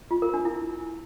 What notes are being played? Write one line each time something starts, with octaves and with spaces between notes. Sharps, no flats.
F4
A#4
D4
E4